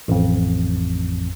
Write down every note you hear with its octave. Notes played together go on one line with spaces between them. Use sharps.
A1 F2